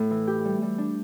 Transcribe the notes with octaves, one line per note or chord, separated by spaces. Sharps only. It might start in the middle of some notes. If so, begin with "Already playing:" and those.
Already playing: A2 A3
E3
G4
G3
G3
D4